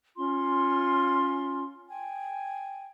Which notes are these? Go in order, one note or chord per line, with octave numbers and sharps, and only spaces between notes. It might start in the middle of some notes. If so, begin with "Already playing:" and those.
C#4 F4 C6
G5 G#5